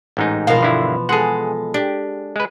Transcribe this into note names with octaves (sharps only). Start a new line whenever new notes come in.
A1 G#2 D#4
B2 E3 F3 A#4 F5
G1 D3 E4
G#3 G#4 A4 F#5
D4 G4
G#3 B4